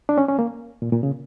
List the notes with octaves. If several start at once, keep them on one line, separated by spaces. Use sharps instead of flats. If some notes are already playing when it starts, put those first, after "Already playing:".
D4
C#4
C#4
A#3
A#2
A#2
C#3